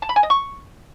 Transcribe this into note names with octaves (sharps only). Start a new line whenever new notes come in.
A5
B5
G#5
D#5
C#6